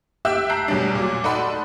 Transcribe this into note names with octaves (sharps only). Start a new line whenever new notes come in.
G4 E5 G5 E6 F#6
A5 A#5 F#6 G6 C7
E2 B2 F#3 G3 D4
A#2 F#3
D#4 A4 D5 F#5 B5 C6